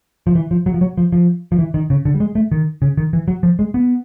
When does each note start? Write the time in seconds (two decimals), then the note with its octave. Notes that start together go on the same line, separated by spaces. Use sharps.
0.27 F3
0.35 E3
0.51 F3
0.66 F#3
0.74 F3
0.81 F#3
0.98 F3
1.12 F3
1.52 F3
1.59 E3
1.74 D#3
1.90 C#3
2.05 D3
2.14 G3
2.20 G#3
2.35 A3
2.52 D#3
2.82 C#3
2.97 D#3
3.13 E3
3.28 F#3
3.43 F3
3.59 G#3
3.74 B3